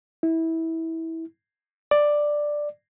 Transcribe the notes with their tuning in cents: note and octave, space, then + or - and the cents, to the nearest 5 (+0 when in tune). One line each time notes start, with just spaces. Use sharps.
E4 -20
D5 +5